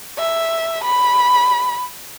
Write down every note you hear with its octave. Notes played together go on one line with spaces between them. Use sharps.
E5
B5